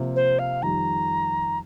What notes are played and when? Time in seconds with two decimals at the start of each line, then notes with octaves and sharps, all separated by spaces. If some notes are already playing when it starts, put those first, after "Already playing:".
Already playing: C3 F3 A#3
0.15 C5
0.38 F5
0.62 F2 D#3 G3 A#5